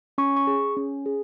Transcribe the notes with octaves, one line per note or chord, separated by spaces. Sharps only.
C#4 C#6
C#6
G#4
C#4
G#4